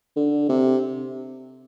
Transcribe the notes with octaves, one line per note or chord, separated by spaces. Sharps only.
D3
C3